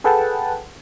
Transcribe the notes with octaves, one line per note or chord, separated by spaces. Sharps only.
G#4 A4 B4 F#5 G5 A5